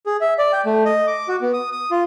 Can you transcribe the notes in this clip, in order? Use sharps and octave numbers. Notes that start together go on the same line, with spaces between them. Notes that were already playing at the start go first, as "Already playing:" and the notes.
G#4
E5
D5
G5
A3
D#5
D6
F#4
B3
D#6
D#6
F4